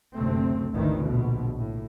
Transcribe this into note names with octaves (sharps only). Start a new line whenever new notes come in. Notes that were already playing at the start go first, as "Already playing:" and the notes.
F#1 D2 C3 A3 C4
G#1 D2 D#3 E3
A#1 B2
A2